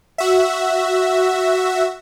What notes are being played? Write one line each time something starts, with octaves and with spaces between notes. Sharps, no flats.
F#4 E5